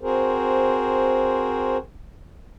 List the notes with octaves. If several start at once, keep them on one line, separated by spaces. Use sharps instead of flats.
C4 F#4 G#4 A#4 C5